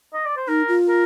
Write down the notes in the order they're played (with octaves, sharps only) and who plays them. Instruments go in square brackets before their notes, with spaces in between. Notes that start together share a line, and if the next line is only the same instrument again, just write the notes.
[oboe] D#5
D5
C5
[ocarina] D#4 [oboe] A#4
[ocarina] F4
[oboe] A#4